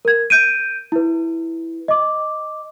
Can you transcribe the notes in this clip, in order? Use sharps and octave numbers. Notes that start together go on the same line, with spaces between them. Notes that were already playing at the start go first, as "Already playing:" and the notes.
A#4 G#6
G6 D7 D#7
E4 B4
D#5 D6